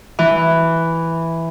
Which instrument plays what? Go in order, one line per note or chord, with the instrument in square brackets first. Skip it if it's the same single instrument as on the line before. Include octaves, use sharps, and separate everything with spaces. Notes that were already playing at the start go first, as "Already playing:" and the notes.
[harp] E3